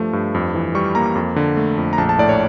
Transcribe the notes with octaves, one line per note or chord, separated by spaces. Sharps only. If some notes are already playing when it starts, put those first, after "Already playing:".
Already playing: G2 F3 A3
G2
F2
E3
G3 C#6
A#3 A#5
F2
D3
A3
F2
A#5
A#1 A5
A5
A2 D5
C#5